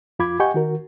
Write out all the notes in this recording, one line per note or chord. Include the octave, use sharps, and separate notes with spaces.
F2 F4 B5 D6 G#6
G4 D#5 F#5 G#5 C#6 G6
D#3 F#4 A#4